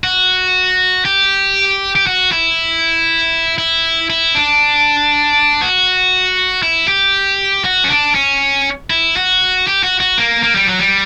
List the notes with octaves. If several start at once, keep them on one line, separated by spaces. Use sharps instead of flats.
F#4
G4
G4
F#4
E4
E4
E4
D4
F#4
E4
G4
F#4
C#4
D4
C#4
E4
F#4
G4
F#4
F#4
A#3
A#3
G3
F#3
G3